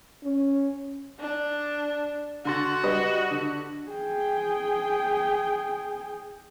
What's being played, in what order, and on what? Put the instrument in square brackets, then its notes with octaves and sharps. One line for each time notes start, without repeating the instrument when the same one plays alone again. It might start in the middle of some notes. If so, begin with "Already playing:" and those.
[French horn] C#4
[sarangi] D4
[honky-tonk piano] D3 C6 A6 [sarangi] F#4
[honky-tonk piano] G3 B4 D#5
D3
[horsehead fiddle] G#4 G5